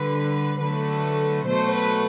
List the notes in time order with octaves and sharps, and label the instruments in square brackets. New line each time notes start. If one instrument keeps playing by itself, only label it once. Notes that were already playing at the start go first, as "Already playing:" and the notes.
Already playing: [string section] D3 G3 B4
D3 F#3 A3 B4
B2 F#3 A3 C5
B4